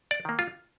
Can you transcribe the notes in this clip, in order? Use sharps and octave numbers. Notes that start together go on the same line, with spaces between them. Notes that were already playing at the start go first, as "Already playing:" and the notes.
D5
D#3 A#3
F4